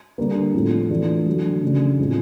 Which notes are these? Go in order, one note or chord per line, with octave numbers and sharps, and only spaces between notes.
D3 G3 A#3
A2 F3 A3 C4
E3 A3 D4 F4
D3 F#3 A3
C#3 F#3 A3 D4
A2 F3 G#3 C4